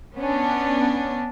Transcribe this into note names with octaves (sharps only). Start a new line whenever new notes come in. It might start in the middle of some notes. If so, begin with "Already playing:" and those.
B3 C#4 D4